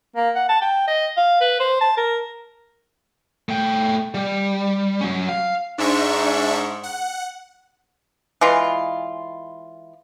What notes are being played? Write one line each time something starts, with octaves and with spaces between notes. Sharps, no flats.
A#3
F#5
A5
G5
D#5
F5
B4
C5
A5
A#4
A3 G5
G3
F#3 C#4
F5
G#2 D4 E5 C#6
F#5
E3 G#3 F4